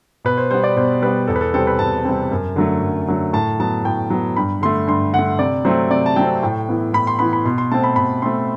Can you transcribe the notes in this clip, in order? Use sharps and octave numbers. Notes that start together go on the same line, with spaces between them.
B2 B4
C5
G3 B3 C5
D5
B2 C5
G3 B3 B4
E2 A4
B4
A4
C3 G3 C4 A4
B4
E2 A5
C3 G3 C4
F#2
D3 F#3 A3
F#2
D3 F#3 A3
A2 A5
F#3 B3 A5
A2 G5
F#3 B3
G2 B5
D3 A3 C6
G2 C6
D3 F#5
A3
C3 D5
F#3 A3 C4 C5
C3 D5
A5
F#3 A3 C4 G5
A2 G5
E3 B3
A2 B5
C6
E3 B3 B5
B5
B2 C6
C6
A3 C4 A5
B5
B2 B5
A3 C4 C6